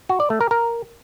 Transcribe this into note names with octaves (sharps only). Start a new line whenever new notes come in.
F#4
D5
A3
A#4
A#4